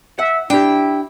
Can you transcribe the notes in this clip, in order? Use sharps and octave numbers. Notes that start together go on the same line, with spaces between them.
E5 F#5
D4 E4 G4 G5